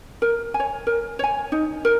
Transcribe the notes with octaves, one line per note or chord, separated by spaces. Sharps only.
A#4
G#5
C#5
A#4
C#5 G#5
D#4
A#4